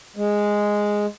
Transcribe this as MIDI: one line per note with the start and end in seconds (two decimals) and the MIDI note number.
0.17 1.06 56